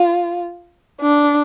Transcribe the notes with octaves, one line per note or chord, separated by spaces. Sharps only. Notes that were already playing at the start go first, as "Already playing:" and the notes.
Already playing: F4
D4